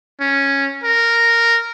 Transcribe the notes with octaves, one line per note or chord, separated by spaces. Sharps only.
C#4
A#4